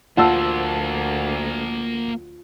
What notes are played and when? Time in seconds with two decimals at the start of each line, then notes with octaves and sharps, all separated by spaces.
0.17 D2 A#3 F4 C5 F#5 A5 E6